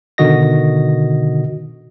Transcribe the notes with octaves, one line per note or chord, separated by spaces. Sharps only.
B2 D3 D#3 F#4 D#5 A#6